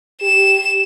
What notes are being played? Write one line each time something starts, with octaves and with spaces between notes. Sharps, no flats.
G4 E7